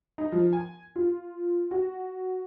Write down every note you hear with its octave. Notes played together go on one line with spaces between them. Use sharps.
D#4
F3
G#5
F4
F#4